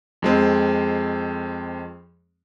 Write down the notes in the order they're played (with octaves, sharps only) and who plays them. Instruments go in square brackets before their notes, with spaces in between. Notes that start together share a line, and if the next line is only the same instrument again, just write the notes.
[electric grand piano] F2 G#3 C4